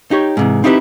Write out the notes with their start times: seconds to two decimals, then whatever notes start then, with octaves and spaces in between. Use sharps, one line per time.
0.11 D#4 G4 C#5
0.37 G#2 C3 E3
0.64 C4 D#4 E4 G4 A#4 B4